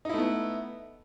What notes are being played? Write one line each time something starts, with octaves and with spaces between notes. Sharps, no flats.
A3 B3 D#4 E4